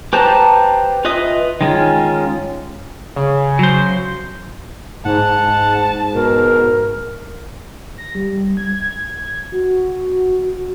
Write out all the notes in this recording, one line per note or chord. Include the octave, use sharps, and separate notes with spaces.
G4 B4 C5 A5 A#5
F4 B4 D#5 E5 D#6
D#3 G#3 C#4 F4
C#3
F#3 C5
G#2 F#5 A5
B2 A#4
A#6
G3
G#6
F#4